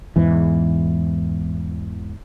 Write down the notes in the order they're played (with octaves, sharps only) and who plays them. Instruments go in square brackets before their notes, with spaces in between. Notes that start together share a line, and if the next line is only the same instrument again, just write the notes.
[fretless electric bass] E2 G#2 E3